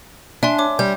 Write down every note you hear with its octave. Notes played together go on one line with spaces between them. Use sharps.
D4 E5 G#5 C6
C#5 D6
G3 G6